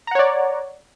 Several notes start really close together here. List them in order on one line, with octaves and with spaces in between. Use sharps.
A#5 F#5 C#5 D5